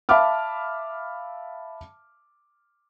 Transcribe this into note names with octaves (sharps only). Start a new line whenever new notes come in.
E5 F5 A5 B5 D6 F6